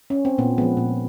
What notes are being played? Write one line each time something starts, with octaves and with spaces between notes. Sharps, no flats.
C#4
C4
A#2 B3
F3 G#3 B3
A#2